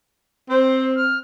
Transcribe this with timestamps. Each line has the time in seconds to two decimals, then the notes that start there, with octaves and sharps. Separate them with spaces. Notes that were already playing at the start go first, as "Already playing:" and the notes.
0.50 C4 C5
0.98 F6